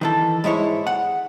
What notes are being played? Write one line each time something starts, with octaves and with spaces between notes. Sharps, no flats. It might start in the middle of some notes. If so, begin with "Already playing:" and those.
D#3 E3 A4
G#2 G#3 E4 C#5
F#5